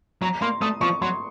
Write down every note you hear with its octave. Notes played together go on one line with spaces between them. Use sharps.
F#3 A#5
A#3 C6
A3 D#6
F3 C#6
F#3 C6